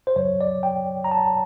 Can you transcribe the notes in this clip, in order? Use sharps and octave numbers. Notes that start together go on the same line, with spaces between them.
C5
F#2 C#3 F#3 C#5
D5
G5
A#5
A5